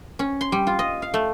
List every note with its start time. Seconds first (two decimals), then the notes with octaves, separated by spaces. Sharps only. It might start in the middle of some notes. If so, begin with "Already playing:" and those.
0.19 C#4
0.41 C6
0.52 G3
0.67 F4
0.79 D#5
1.02 F5
1.14 A3